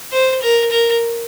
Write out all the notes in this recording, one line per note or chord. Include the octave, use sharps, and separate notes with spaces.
C5
A#4
A#4